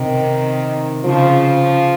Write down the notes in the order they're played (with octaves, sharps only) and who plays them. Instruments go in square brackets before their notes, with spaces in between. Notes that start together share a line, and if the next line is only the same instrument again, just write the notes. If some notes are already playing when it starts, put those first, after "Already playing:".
Already playing: [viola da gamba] C3 [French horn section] D#3
[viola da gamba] C#3 [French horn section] F3